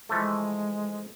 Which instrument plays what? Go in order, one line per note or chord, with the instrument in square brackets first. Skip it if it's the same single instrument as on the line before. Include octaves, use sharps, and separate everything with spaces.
[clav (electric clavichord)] E3 F3 A3 [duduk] G#3